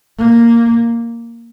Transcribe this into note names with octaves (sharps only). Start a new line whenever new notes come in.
A#3